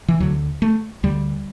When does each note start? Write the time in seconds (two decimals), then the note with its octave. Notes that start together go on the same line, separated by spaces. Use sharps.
0.08 E3
0.20 D2 D3 F#3
0.62 A3
1.03 D2 D3 G3